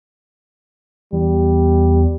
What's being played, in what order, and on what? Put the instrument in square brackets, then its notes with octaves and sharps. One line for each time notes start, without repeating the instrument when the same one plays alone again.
[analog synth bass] E2 [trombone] G3